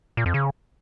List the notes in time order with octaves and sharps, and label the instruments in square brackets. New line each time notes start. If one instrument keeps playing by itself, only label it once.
[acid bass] A#2
F2
C#3